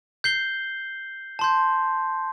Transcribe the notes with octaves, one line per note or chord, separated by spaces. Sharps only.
G6 C7 G7
A5 C6 G6